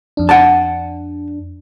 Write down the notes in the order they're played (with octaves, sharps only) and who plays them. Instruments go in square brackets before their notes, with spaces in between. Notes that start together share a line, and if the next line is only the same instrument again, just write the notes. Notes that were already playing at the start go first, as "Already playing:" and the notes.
[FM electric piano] F2 D4
[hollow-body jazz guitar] F#5 A5